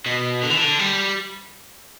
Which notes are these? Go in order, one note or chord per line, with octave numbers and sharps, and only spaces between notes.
B2
D3
E3
D3
G3